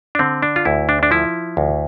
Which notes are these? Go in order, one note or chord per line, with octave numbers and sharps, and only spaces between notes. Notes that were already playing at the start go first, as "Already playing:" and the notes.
D4
D3 C4
D4
F4
D2 E4
D4
D4
F3 E4
D2